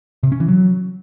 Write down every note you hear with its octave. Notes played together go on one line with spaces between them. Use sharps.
C3
C#4
E3
F#3